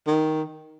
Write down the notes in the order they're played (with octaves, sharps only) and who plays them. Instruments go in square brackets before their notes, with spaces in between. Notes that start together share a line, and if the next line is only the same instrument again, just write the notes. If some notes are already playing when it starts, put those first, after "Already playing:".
[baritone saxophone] D#3